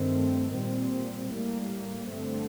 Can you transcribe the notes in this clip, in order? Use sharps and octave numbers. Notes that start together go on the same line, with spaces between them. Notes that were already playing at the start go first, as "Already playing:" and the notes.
Already playing: G2 D#3 A3 C4
A#2 G3 C4
A2 G3 A#3
G2 D3 A3 C4